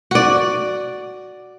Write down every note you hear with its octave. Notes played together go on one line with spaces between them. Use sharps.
F#4 D5